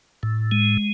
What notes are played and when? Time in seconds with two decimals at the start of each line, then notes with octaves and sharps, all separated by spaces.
0.23 A2
0.52 G#3